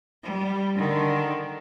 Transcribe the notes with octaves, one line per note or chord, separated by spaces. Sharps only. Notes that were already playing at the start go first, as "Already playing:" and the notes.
G3
D3 D#3